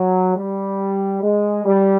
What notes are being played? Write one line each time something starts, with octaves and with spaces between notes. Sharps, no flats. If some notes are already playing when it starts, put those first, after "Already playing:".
Already playing: F#3
G3
G#3
G3